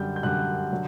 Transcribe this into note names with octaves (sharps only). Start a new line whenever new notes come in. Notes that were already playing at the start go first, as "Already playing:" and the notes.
Already playing: F#2 D3 G3 G6
G6
F#2 D3 G3 F#6
D3 F#3